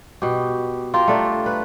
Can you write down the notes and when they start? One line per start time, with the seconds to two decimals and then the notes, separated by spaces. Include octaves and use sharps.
0.22 B2 G4
0.94 F4 G4 A#4
1.08 A3 D4 A#4
1.46 B4